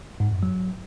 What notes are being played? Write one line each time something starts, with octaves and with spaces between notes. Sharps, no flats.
G#2
F#2
F#3